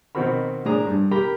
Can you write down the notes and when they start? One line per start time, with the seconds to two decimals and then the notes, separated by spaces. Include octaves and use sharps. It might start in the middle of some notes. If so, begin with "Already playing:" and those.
0.15 B2 D#3 C4 F#4 A#4 B5
0.66 A2 D4 G#4 A#5 D#6
0.87 G2
1.11 G4 A#4 A#5 B5